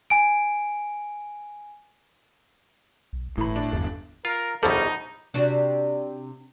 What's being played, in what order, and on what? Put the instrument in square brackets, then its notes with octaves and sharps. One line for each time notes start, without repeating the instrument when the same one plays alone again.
[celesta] G#5 D7
[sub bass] B1
[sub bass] G1 [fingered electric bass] A2 [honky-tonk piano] E3 B5
[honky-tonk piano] D4
[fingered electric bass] G1 [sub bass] E2
[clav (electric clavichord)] F4 [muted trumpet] A#4
[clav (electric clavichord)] A#1 B2 G3 [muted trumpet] D#4 [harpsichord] A4 C5 C#5
[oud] C3 D4 F#4